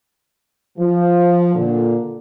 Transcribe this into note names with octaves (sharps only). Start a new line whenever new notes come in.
F3
A#2 D3